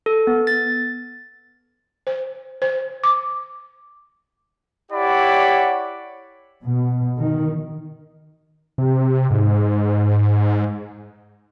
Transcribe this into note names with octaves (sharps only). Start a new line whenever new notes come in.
A4
B3
A6
C5
C5
D6
E4 G4 C#5 D5 F#5 B5
B2
D#3
C3
G#2